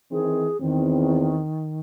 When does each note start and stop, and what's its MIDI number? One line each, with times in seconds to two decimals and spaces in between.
0.11 0.50 51
0.11 0.50 52
0.11 0.50 60
0.11 0.60 68
0.61 1.44 40
0.61 1.80 51
0.61 1.44 60